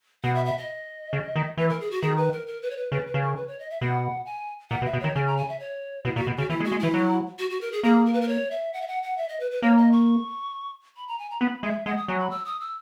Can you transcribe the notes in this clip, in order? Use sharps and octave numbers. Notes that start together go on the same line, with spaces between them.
B2 F#5
E5
E5
D#5
C#3
D#3
E3 B4
A#4
G#4
F#4
D#3 G#4
B4
A#4
A#4
B4
C#5
B4
C#3 B4
B4
C#3
A#4
B4
C#5
D#5
E5
B2 F#5
G#5
A#2 F#5
B2
E5
B2
D#3 C#5
C#3 G#5
A#5
G#5
E5
C#5
B2 E4
A#2 F#4
B2
C#3 F#4
E3 E4
G#3
F#4
G#3
E3 E4
F#3
F#4
F#4
A#4
G#4
A#3 G#4
A#4
B4
A#4
C#5
E5
F#5
E5
F#5
F#5
E5
D#5
B4
B4
A#3 C#5
D#5
C#6
B5
A#5
G#5
A#5
B3 B5
G#3 E5
G#3 F#5
D#6
F#3 G#5
B5
E6
D#6
E6